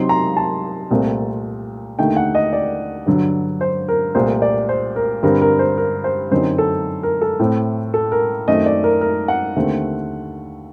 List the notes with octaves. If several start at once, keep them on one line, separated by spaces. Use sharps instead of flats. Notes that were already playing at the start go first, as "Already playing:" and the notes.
Already playing: C3 F#3 C4 D#4 C6
A#5
A5
C2 A#2 A3 C4
D#2 D3 A3 D#4 G5
F#5
D#5
D5
G2 D3 F#3
C5
A#4
C2 A#2 A3 C5
D5
C5
A#4
G2 D3 G3 C4 A#4
A#4
C5
A#4
C5
F#2 D3 F#3 C4 D#4 C5
A4
A#4
A4
A2 A3 C4
A4
A#4
F#2 D#3 F#3 A3 C4 D#5
D5
A#4
A#4
F#5
D#2 D3 A3 C4